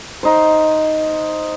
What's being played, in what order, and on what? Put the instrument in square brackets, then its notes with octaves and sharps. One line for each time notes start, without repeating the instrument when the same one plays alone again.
[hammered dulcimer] D#4 C5